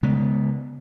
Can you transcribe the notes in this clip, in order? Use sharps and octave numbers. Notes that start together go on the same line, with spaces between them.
C#3 G#3 B3